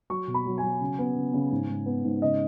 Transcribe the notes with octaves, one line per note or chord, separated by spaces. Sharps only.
F#3 C#6
B2
B5
F#3
F#3 G#5
C#3
B3
C#3
C#3
G#2
G#2
B3
G#2
C#3 D#5